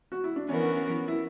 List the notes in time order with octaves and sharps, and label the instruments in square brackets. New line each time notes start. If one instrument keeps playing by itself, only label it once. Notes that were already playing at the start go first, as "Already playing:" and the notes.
[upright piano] F#4
E4
D4
[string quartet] E3 B3 F#4 A#4 [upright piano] C#4
[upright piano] E4